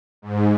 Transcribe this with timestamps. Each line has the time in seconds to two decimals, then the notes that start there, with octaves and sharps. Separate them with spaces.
0.22 G#2